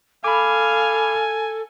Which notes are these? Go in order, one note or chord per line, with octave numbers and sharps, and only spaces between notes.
A4 F5 G#5 B5 D6